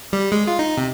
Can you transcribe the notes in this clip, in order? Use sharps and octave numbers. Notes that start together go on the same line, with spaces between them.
G3
G#3
F4
D#4
C3